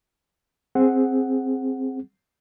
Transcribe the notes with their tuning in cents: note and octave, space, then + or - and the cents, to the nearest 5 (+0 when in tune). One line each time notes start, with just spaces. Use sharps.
C4 +5 G#4 +0 F#5 +0